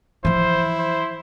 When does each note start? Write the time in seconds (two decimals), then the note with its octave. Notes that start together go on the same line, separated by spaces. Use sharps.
0.25 E3 F3 E4 C5
0.79 C5